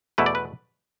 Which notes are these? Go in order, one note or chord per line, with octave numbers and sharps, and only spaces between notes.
E2 B2 A3 E4 B4
D5
B4